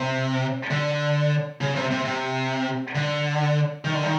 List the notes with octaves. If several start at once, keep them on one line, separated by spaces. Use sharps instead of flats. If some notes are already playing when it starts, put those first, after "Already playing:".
Already playing: C3
D3
C#3
C3
C3
C3
D3
D#3
D3
D#3